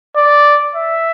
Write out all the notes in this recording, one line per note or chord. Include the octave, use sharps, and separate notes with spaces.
D5
E5